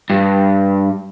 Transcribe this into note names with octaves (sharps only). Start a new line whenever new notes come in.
G2